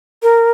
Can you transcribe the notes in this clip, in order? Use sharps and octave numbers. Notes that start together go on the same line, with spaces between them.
A#4